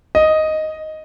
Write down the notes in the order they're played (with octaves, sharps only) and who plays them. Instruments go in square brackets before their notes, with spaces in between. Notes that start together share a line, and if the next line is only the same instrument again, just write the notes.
[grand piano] D#5